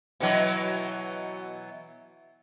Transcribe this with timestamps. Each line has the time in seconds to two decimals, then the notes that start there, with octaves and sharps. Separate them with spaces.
0.20 B2 E3 F#3